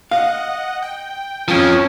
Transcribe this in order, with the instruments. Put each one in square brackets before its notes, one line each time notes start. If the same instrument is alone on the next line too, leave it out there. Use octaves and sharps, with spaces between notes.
[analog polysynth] D#5 F#5 [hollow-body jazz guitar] F5
[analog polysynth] G5
[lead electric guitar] F2 F3 [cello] C#4 [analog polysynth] G#5 A5 D#6